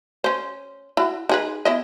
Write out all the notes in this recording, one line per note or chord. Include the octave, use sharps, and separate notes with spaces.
C#4 C5
E4 F#4
D#4 G#4 B4
B3 E4 D#5